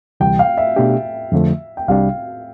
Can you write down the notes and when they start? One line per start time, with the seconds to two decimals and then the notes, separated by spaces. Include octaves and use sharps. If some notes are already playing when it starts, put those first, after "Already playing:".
0.20 D2 C3 E3 G3 G5
0.39 F5
0.58 E5
0.76 B2 A3 D4 G4
1.32 F2 D3 F3 A3
1.77 G5
1.88 C2 C3 G3 D4 F5